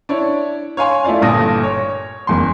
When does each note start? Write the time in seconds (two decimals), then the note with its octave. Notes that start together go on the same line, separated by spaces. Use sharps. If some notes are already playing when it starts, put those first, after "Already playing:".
0.09 D4 E4 C#5
0.77 C#5 F5 G#5 C6
1.04 A3 E4 F4 D5 F5
1.21 G1 G2 A#2 A4 D#6 A#6
1.63 C#5
2.27 F#1 E2 C6